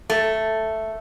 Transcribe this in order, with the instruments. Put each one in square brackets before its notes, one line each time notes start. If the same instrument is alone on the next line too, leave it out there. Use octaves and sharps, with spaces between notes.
[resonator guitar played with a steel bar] A3